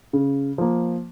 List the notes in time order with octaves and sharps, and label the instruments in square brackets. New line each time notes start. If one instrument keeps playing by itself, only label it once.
[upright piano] C#3
F3 A#3